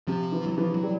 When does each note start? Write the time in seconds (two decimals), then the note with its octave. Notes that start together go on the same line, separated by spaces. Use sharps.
0.07 C3 F3
0.32 E3
0.46 F#3
0.58 E3 F3
0.74 F#3
0.83 G3